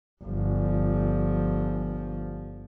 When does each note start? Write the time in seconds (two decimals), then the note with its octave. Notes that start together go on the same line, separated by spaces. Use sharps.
0.24 G1 F3